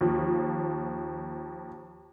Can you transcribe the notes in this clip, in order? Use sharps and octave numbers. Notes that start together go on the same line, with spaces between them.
D#2 F3